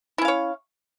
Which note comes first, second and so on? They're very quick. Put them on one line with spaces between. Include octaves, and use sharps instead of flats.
E4 C#4 F5 C#5